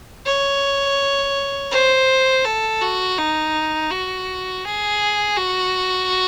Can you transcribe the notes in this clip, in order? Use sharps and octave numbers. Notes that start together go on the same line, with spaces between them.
C#5
C5
A4
F#4
D#4
F#4
G#4
F#4